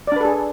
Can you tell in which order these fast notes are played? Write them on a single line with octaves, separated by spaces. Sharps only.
D5 D4 B4 A4 G#4